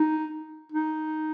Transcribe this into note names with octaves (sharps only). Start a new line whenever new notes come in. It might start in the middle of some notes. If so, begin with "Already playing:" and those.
Already playing: D#4
D#4